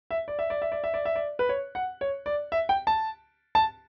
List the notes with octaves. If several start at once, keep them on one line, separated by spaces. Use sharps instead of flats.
E5
D5
E5
D5
E5
D5
E5
D5
E5
D5
B4
C#5
F#5
C#5
D5
E5
G5
A5
A5